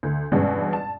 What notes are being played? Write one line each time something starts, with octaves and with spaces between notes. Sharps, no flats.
D2
E2 G2 B2 G#3 B3 C#4
A5